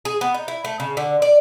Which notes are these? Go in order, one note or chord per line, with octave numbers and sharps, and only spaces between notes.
G#4
B3
D#4
E4
A3
C#3
D3
D5